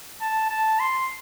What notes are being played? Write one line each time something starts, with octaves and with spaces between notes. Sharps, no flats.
A5
A5
C6